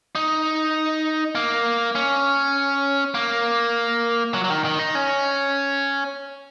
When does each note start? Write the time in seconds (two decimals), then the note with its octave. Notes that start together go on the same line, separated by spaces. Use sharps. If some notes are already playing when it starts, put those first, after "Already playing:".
0.15 D#4
1.35 A#3
1.95 C#4
3.14 A#3
4.34 F#3
4.44 F#3
4.50 D#3
4.65 D#3
4.79 D#4
4.95 C#4